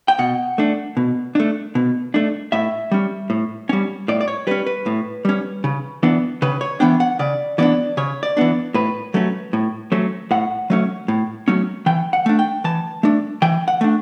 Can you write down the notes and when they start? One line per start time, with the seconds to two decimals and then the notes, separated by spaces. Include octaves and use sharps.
0.08 G5
0.19 B2 F#5
0.58 A3 D4
0.97 B2
1.35 A3 D4
1.75 B2
2.14 A3 D4
2.52 A2 E5
2.91 G3 C#4
3.30 A2
3.69 G3 C#4
4.08 A2 D5
4.21 D5
4.28 C#5
4.47 G3 C#4 B4
4.67 B4
4.86 A2
5.25 G3 C#4
5.64 C#3
6.03 E3 B3 D4
6.42 C#3 B4
6.61 C#5
6.80 E3 B3 D4 G5
7.00 F#5
7.19 C#3 D5
7.58 E3 B3 D4 D5
7.97 C#3 C#5
8.23 D5
8.37 E3 B3 D4
8.74 A2 B4
9.14 F#3 A3 C#4
9.53 A2
9.92 F#3 A3 C#4
10.31 A2 F#5
10.70 F#3 A3 C#4
11.08 A2
11.48 F#3 A3 C#4
11.86 E3 G5
12.13 F#5
12.26 A3 D4
12.39 G5
12.64 E3 A5
13.03 A3 D4
13.42 E3 G5
13.68 F#5
13.81 A3 D4